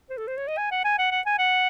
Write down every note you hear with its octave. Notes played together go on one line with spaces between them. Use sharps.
C5
A4
C5
C#5
D#5
G#5
F#5
G#5
F#5
F#5
G#5
F#5